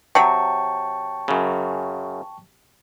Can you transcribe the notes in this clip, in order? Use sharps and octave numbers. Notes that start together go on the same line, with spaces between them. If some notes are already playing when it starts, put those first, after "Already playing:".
C3 F#3 G5 A5 C#6
F#2 C#3